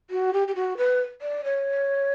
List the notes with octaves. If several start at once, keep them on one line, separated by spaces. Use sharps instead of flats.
F#4
G4
G4
F#4
B4
D5
C#5